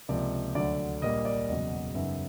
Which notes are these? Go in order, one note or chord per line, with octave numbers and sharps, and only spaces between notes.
C#2 C3 F3 A#3 D5
D2 D3 F#3 A3 D5
A#1 A#2 G3 A#3 D#5
D5
E1 E2 C#3 F#3 D#5
F#2 C#3 F#3 B3 D#4 E5